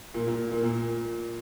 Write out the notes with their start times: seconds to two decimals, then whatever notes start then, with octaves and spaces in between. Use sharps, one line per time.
0.14 A#2 A#3
0.27 A#2 A#3
0.51 A#2 A#3
0.63 A#2 A#3